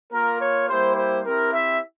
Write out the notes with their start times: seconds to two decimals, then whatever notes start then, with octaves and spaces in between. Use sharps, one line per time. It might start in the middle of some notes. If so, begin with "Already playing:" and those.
0.13 A#3 F4 A#4
0.41 C#5
0.69 G3 A#3 E4 G4 C5
0.96 C5
1.25 C4 E4 G4 A#4
1.53 E5